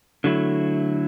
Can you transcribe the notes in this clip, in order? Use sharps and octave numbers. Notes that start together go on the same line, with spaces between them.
D3 F#3 A3 E4